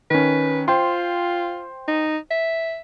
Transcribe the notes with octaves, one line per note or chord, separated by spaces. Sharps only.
D#3 C#4 B4
F4 C5 G5 C6
D#4
E5